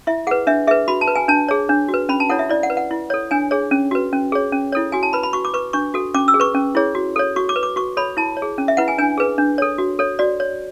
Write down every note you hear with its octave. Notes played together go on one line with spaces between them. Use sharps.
E4 E5
G#4 B4 F#5
D4 E5
G#4 B4 E5
F#4 B5
A5
B4
G#5
D4 A5
G#4 C#5
D4
F#4
B4
C#4 B5
A5
E4 A4 C#5 F#5
E5
E4 D5
F#5
B4
F#5
E4
A4 C#5
D4 G#5
G#4 C#5
C#4
F#4 B4
C#4
G#4 C#5
C#4
E4 A4 C#5
F#4 G#5
A5
B4 B5
B5
F#4 C#6
D6
B4 C#6
D4 C#6
F#4 A4
C#4 D6
E6
G#4
B4 C#6
C#4
E4 G#4 C#5
F#4
A4 C#5
F#4 C#6
D6
B4
D6
F#4 C#6
A4 C#5 B5
E4 A5
C#5
G#4
C#4
E5
E4 B4 F#5
G#5
D4 G#5
G#4 B4
D4
A4 C#5
F#4
A4 C#5
F#4 D5
C#5